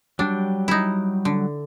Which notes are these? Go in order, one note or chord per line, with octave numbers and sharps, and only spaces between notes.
F#3 G3 D4 G5
D#4 E4
D3